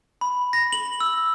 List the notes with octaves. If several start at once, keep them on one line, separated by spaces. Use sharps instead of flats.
B5
A#6
F#7
E6